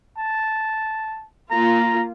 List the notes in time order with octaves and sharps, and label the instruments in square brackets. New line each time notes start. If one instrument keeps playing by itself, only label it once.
[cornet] A5
[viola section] A#3 F4 [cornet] A#5